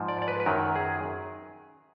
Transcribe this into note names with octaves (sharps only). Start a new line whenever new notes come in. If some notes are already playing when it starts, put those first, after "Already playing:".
Already playing: G#2 F3
D5
D5
B4
B4
F#2 D#3 F#3 A#4
G#4